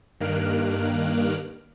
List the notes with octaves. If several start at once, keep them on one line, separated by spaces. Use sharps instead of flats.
G2 D#3 A#3 F6 F#6 D7